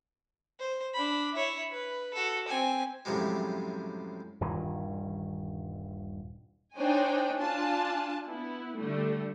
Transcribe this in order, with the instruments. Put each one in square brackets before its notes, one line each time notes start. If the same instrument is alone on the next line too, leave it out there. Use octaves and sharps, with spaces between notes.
[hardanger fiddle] C5
D4 B5
E4 C#5
B4
F#4 A4
C4 G#5
[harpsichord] F#2 A2 C3 F3 G3 G#3
[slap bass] D#1 G2 D#3 E3
[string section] D4 D#4 C5 C#5 G5 G#5
D4 F4 G#5 A5
B3 E4
D3 G3 A3